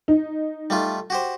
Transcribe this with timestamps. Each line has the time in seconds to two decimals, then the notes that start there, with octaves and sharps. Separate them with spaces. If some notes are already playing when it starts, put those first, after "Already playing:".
0.08 D#4
0.70 G3 A3 F4
1.10 F#4 G4 C5